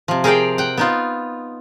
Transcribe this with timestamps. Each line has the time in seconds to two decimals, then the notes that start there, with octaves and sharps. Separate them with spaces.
0.08 C3 F3
0.24 G#4 A#4 C5 D5 F5 G5
0.58 F#5 G5
0.77 B3 D#4 F4